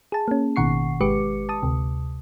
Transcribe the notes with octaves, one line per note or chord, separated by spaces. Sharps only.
G#4 A5
A#3 C#4
A1 B2 D#3 F#5 C#6 C7
G#1 G#3 G4 B4 D6 C#7
A5 D#6
D2 C3